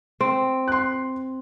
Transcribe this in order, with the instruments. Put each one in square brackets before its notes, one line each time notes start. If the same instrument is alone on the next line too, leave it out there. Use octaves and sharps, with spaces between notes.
[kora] C4
[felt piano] C6 F#6